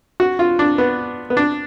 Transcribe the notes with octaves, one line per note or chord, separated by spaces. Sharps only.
F#4
F4
D4
B3
B3
D4